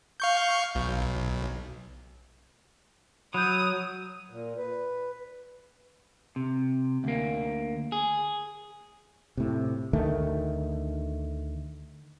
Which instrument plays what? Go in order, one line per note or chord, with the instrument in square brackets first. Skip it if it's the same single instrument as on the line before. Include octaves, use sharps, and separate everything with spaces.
[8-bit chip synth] F5 C#6 G6
B1
[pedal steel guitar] F#3 [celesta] B5 F#6 G6 [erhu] D#6
[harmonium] A#2
B4
[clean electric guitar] C3
D2 A#3
G#4
[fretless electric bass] A2 C3
D2 D#3 A3